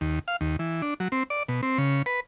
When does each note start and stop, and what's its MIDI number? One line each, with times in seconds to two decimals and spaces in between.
0.01 0.19 39
0.28 0.36 77
0.41 0.56 39
0.59 0.82 52
0.82 0.94 62
1.00 1.08 54
1.12 1.23 60
1.30 1.43 74
1.49 1.61 47
1.63 1.78 60
1.78 2.02 49
2.06 2.20 71